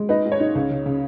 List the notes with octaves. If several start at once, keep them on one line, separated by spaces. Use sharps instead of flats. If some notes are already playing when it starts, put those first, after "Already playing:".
Already playing: G#3
D#4 B4 D#5
G#2
C#5
D#4
C#2
C#3
C#3